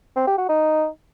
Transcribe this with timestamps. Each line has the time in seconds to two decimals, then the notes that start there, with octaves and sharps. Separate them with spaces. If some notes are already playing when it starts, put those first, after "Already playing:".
0.17 C4
0.27 G4
0.38 F#4
0.49 D#4